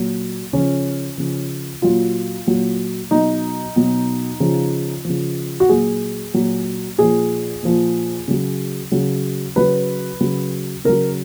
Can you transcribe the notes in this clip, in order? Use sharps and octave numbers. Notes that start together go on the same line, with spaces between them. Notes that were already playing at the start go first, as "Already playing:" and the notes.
Already playing: A#2 F#3
C#3 F3 C#4
C#3 F3
A#2 F#3 F4
A#2 F#3
B2 F#3 D#4
B2 F#3
C#3 F3
C#3 F3
F#4
A#2 F#3 G#4
A#2 F#3
A#2 F3 G#4
A#2 F3
C#3 F#3
C#3 F#3
C#3 F#3 B4
C#3 F#3
C#3 F#3 A#4